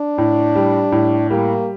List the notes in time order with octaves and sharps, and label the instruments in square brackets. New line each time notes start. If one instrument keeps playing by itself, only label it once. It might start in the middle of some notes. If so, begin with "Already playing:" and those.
Already playing: [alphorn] D4
[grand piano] A2
G3
A2
[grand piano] G3 [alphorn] A#3